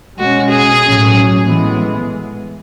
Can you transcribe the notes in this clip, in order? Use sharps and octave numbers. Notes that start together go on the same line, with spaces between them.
B2 G#3 C#4 F#4
G#4
A2 F#3 C#4
A2 E3 G#3 B3